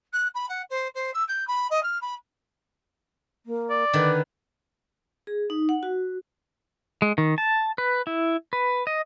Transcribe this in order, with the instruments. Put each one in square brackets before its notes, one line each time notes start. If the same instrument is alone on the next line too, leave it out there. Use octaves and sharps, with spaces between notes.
[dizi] F#6
B5
F#5
C5
C5
E6
G6
B5
D#5
F6
B5
[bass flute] A#3
[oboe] D5
[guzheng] D3 D#3 [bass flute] B4
[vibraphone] G#4
D#4
F#5
F#4
[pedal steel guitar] G#3
D#3
A5
B4
E4
B4
D#5